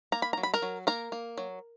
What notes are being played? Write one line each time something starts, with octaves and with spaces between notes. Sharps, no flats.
A#3 A#5
B5
F#3 A#5
B5
A#4 A#5
F#3
A#3 A#4 A#5
A#3
F#3